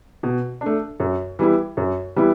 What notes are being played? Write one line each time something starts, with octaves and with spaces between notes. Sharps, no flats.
B2
A3 D4
F#2
E3 G3 B3 E4
F#2
E3 G3 B3 E4